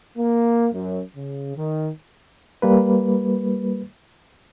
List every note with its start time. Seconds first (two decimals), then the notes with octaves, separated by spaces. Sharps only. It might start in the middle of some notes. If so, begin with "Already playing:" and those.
0.17 A#3
0.73 F#2
1.15 C#3
1.56 D#3
2.62 G3 A#3 B4